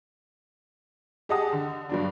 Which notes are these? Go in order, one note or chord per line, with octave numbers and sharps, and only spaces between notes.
G4 G#4 D#5 F#5 A5 D#6
D3
G2 F#3 D4